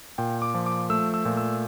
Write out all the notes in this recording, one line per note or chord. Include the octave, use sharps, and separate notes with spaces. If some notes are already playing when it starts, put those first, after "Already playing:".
A#2 G5
D6
F3
D6
A3 E6
E6
A#2
E6